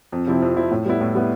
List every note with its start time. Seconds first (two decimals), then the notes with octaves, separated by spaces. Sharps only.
0.12 F2
0.27 C3 F3 C4 E4
0.42 F2
0.56 C3 F3 C4 E4
0.71 A2
0.86 G3 B3 E4
1.01 A2
1.15 G3 B3 E4